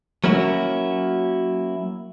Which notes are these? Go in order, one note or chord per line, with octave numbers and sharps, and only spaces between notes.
F#3 A#3 C#4 E4 F#4